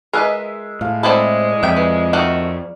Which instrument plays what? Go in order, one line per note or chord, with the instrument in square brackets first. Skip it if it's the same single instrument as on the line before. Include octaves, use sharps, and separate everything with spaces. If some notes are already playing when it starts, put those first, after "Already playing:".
[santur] G#3 E5 [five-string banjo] A#4 B4 D#5
[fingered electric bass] A2 [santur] F5
[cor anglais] G#3 [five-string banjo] C4 E4 A4 [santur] D5 B5
[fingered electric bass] F2 [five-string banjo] E5 G5
[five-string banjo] E3
D#3 A3 F#4